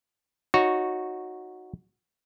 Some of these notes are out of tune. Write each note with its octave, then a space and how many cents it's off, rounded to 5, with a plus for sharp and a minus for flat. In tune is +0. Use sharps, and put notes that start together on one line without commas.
D#4 +0 F#4 -10 C#5 +0